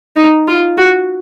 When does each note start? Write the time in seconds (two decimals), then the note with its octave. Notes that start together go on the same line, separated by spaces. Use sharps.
0.16 D#4
0.48 F4
0.77 F#4